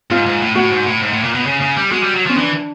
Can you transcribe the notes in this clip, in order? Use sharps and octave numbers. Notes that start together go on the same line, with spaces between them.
G#2 F4
G#2
A2
A2 F#4
G#2
A2
G#2
A2
A#2
B2
C#3
C#3
G3
G#3 F#4
G3
F#3
F3 C#4
E3 D4